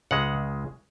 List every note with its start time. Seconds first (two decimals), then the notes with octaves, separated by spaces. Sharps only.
0.11 C#2 C#3 G#3 F#5